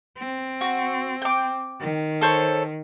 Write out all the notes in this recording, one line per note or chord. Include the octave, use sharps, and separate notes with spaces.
C4
F#4
G5 D6
D#3
A4 C5 C#5